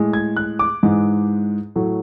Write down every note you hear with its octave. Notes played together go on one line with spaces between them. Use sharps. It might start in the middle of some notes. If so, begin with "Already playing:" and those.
Already playing: A2 G#3
G#6
F#6
D6
G#2 E3 G#3
A2 F#3 A3